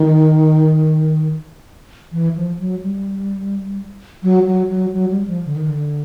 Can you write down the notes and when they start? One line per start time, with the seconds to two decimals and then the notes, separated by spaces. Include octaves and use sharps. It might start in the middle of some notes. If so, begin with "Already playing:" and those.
Already playing: D#3
2.12 E3
2.36 F3
2.59 F#3
2.83 G3
4.23 F#3
4.46 F#3
4.69 F#3
4.93 F#3
5.11 G3
5.27 F3
5.45 D3
5.56 D#3
5.67 D3